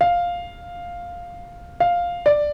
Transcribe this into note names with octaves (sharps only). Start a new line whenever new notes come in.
F5
F5
D5